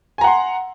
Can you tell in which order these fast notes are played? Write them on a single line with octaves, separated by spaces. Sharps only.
G#5 A#5 F#5 C6